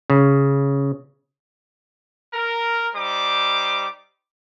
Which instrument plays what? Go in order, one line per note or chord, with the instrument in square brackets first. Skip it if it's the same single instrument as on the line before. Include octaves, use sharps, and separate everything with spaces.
[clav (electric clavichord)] C#3
[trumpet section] A#4
G3 D#4 C5 D6